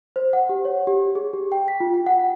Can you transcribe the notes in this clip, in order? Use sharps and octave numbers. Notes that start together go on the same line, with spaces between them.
C5
F#5
G4
C#5
G4
G#4
G4
G5
B6
F4
G5
F#5